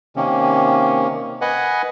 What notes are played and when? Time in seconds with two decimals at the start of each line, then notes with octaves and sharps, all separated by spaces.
0.16 C3 D#3 A#3 C#4
1.41 B4 D#5 F#5 G#5